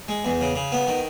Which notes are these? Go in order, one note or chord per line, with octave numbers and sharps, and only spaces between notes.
G#3
E2
C#3
C#3
B3
D#3